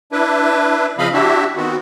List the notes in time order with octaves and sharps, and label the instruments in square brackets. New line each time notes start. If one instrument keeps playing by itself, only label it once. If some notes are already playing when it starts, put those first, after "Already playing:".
[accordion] D4 E4 B4
C#3 F3 C4 D#5 F5 B5
D4 E4 F#4 G4 E5
D#3 B3 C4 F#4